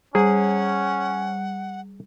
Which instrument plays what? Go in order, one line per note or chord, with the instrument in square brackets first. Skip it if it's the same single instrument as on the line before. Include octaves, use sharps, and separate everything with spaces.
[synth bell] G3 [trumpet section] C#4 [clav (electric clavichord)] G#4 [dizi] F#5